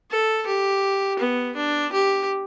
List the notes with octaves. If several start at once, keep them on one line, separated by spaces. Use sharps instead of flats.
A4
G4
B3
D4
G4